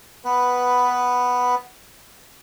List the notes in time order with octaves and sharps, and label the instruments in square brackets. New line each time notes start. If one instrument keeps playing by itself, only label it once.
[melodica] B3 B4